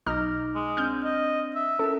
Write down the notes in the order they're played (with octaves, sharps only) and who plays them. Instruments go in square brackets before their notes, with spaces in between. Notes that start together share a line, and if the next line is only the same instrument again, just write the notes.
[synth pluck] B1 D#4 F6 [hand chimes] D6 G6 A#6
[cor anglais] G#3
[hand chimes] C4 D4 D#6 [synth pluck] F6 G6
[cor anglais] D#5
E5
[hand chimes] C#4 E4 A#4 [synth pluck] A4